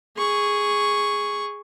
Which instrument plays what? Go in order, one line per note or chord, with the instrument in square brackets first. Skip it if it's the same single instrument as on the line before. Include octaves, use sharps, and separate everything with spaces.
[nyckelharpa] G#4 C#6